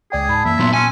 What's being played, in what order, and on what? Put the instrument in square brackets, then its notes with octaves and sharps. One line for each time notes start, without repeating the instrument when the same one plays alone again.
[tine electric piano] C#2 D5 G5 [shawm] G#4
[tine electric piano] G#2 [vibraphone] A5 B5
[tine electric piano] F#2 E3 A#3 [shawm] E5
[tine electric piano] A#2 [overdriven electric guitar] F#3 B3 [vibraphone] C6
[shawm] C#4 [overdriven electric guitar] G#5